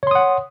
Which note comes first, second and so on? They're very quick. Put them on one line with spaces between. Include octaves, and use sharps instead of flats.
C#5 C6 D#6 F#5